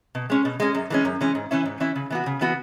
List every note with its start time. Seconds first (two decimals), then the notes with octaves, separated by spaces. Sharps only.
0.15 B2
0.30 G#3 C#4
0.45 B2
0.60 G#3 C#4
0.74 F#2
0.90 E3 G#3 C#4
1.05 F#2
1.21 E3 G#3 C#4
1.35 G#2
1.51 E3 C#4 E4
1.65 G#2
1.80 E3 C#4 E4
1.96 C#3
2.10 E3 B3 F#4
2.26 C#3
2.41 E3 B3 F#4